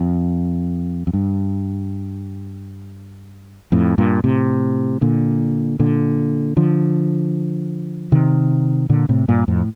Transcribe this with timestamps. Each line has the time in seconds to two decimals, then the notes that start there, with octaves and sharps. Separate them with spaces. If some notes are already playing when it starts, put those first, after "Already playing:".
Already playing: F2
1.07 F2
1.13 G2
3.72 F2 A2
3.98 G2 A#2
4.24 A2 C3
5.01 A#2 D3
5.79 A#2 D3
6.57 D3 F3
8.12 C3 D#3
8.89 A#2 D3
9.09 A2 C3
9.28 G2 A#2
9.48 F2 A2